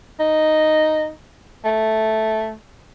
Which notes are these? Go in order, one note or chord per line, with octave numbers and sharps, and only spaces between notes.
D#4
A3